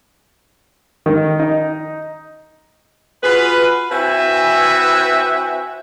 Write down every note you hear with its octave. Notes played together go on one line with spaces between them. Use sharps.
D#3
D#4
F4 F#4 G#4 B4
C4 E4 F#4 B4 E5 G#5